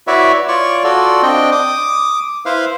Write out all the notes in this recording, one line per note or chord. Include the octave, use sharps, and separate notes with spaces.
E4 F#4 B4 C#5 D5 E5
F4 C#5 D5 C#6
F4 F#4 A4 D5
C4 D4 D#5 G5
D6 D#6
E4 B4 C5 F5